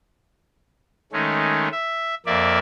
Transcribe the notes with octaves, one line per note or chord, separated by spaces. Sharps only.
D#3 G#3 A3 C#4
E5
F2 A#3 D5 E5